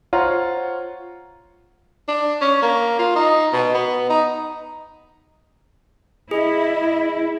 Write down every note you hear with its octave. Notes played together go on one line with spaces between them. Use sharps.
F4 C5 C#5 F#5 A#5
D4
C#4
A#3
F4
D#4
B2
B3
D#4
E4 G#4 D#5